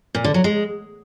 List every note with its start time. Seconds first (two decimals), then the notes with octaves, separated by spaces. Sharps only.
0.15 A#2
0.24 D3
0.34 F#3
0.44 G#3